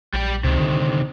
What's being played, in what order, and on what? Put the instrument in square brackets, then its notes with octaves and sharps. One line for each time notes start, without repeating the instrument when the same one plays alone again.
[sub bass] A#1 [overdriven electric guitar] G3 G5
[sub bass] C#2 [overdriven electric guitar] C3 D#3
[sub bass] D3